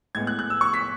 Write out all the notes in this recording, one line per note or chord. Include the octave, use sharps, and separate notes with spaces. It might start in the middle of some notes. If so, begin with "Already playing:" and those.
A2 G#3 B3 G#6
F#6
F#6
E6
C#6
B6